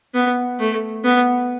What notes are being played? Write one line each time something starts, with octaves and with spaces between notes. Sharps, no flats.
B3
A3
B3